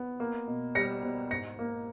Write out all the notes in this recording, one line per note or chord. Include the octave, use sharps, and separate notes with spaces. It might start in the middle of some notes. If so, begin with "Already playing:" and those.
Already playing: B3
A#3
B2
G3 A#6 C#7
B2
G#2 A#6 C#7
A#3